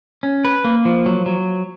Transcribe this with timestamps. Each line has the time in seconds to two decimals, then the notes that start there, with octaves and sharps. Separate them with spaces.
0.23 C#4
0.45 B4
0.64 A#3
0.85 F3
1.06 F#3
1.26 F#3